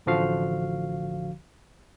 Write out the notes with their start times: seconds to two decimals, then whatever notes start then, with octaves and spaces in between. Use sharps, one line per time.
0.06 A1 D3 F3 F#4 F5